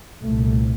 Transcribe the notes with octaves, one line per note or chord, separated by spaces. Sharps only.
C2 A#2 A3